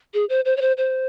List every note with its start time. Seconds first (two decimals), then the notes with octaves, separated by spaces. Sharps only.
0.14 G#4
0.29 C5
0.45 C5
0.57 C#5
0.61 C5
0.77 C5